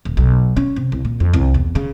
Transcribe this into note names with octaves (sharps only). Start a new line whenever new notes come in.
D#1
B1
C#4
C3
C2
A#2
F2
C2
E2
C#3